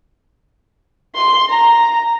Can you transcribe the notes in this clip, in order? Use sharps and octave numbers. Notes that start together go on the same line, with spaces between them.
C6
A#5